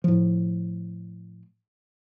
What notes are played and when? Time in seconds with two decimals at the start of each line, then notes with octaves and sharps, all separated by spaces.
0.04 A2 F3